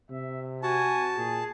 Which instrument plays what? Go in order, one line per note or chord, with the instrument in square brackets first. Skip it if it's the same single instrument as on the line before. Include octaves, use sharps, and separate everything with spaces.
[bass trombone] C3 [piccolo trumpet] E5
[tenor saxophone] F#4 [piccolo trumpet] G#5 [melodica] A5
[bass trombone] A#2 [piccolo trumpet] G#4